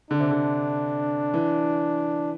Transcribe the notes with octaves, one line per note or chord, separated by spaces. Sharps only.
D3 D4
C3
D3
E3